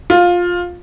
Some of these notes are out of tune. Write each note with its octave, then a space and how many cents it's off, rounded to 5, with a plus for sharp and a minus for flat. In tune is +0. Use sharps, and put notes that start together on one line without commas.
F4 +10